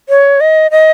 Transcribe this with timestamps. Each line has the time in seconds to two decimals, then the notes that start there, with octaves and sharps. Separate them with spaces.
0.09 C#5
0.41 D#5
0.71 D#5